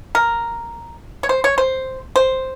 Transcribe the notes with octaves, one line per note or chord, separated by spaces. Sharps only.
A#4
C#5
C5
C#5
C5
C5